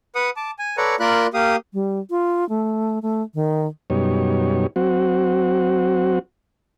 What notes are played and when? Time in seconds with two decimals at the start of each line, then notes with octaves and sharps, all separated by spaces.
0.15 B4 F#5 D#6
0.36 A5 D6
0.59 G#5
0.77 A4 B4 C#5 D5 F#5 A#5
1.00 A#3 F4 A#4 D5 B5 F#6
1.34 A#3 G4 F5 D#6
1.74 G3
2.10 F4
2.49 A3
3.02 A3
3.34 D#3
3.90 F#2 B2 G3 D#4 C#5
4.76 F#3 C4 F#4